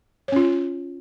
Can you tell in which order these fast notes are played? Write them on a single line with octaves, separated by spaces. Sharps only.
C#5 C#4 F4